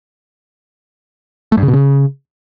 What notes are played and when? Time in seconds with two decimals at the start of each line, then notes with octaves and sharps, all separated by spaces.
1.52 A3
1.57 G2
1.63 C#3
1.68 B2
1.73 C#3